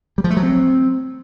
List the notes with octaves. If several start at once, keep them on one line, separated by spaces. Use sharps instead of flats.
G3
F3
A3
F#3
C4